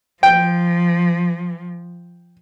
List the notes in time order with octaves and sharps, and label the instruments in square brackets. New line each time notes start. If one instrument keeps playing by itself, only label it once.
[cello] F3 [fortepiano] G5